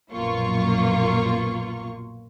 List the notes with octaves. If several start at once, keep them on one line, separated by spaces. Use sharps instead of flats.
A#1 F#2 B2 A#3 F4 C#6